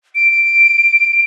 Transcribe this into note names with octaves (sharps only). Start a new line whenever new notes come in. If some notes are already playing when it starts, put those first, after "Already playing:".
D7